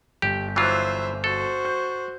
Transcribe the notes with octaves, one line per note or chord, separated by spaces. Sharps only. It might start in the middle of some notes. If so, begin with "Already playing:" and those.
G1 G4
E3 F#3 F4 C5 E5
F#4 A4 C5
G6